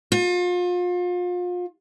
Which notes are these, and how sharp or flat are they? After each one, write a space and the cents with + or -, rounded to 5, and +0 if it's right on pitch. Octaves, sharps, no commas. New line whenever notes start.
F4 +35